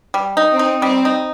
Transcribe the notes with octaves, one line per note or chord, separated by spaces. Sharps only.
G3
D#4
C4
D#4
G3 C4
D#4